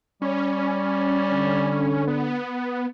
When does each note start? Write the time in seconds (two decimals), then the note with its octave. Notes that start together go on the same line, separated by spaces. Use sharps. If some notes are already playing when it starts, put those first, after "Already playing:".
0.22 G3 C#4
1.30 D3
2.07 B3